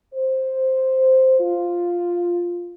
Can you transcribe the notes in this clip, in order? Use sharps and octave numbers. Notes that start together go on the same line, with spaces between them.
C5
F4